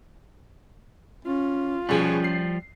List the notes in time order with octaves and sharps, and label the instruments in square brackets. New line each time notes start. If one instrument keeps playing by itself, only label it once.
[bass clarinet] C#4 [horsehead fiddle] F4
[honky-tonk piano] B2 G#4 [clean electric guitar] F3 G3 [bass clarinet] C#4
[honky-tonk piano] C7